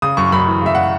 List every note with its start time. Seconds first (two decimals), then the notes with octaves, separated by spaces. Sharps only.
0.02 C#3 D#6
0.17 F#2 C#6
0.32 F#2 B5
0.47 E3
0.62 C#3 E5
0.75 F#5